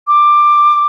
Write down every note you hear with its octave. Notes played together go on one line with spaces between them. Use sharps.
D6